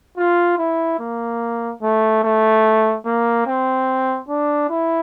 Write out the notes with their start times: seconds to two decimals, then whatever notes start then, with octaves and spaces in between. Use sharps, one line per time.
0.17 F4
0.58 E4
0.99 A#3
1.82 A3
2.23 A3
3.06 A#3
3.47 C4
4.29 D4
4.70 E4